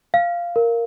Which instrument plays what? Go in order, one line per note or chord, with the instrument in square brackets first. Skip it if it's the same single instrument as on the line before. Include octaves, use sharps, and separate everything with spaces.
[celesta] F5
A#4